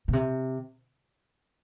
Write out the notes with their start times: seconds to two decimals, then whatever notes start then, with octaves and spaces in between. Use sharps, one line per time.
0.08 B2
0.13 C3